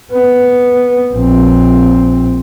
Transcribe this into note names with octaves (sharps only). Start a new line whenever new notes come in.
B3
A#1 C4